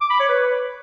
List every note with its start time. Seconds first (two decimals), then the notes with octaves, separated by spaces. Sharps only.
0.01 D6
0.10 B5
0.20 C#5
0.29 B4